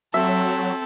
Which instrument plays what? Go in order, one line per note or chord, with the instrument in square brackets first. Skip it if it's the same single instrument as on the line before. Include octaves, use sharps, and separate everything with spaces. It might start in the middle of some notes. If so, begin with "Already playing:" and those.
[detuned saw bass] F#3 [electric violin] C4 A4 [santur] E5